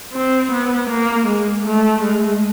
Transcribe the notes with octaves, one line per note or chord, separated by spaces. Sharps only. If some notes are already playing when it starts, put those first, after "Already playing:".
C4
B3
A#3
G#3
A3
G#3